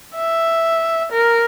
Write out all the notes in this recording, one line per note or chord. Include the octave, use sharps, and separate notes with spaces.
E5
A#4